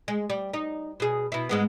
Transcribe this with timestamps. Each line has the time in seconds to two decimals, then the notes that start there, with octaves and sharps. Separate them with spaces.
0.08 G#3
0.30 G3
0.54 D#4
1.00 B2 G#4
1.32 B2 E4
1.49 G#2 G#3 B3